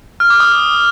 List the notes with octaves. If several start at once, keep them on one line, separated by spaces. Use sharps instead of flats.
F6
D6
D#6